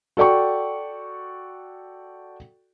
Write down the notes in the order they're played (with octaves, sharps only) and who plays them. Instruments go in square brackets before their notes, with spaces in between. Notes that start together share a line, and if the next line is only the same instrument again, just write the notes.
[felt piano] F#4 A4 D5 G5 C#6